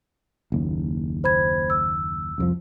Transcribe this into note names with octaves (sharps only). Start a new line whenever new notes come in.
F#1 D#2
C5 B5 G#6
E6
C2 F2 F3